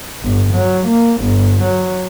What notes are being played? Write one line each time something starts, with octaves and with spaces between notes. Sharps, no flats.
G1
F#3
A#3
G1
F#3